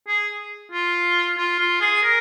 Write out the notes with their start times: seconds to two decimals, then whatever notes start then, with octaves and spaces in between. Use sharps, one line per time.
0.07 G#4
0.72 F4
1.38 F4
1.59 F4
1.81 G#4
2.03 A#4